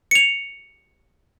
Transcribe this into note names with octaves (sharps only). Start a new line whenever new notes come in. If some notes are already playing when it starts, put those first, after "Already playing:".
C#7 F7